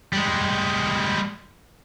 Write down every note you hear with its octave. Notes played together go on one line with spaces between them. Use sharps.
G3 G#3